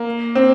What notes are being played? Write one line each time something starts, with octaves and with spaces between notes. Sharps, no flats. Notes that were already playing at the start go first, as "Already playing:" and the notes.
Already playing: A#3
C4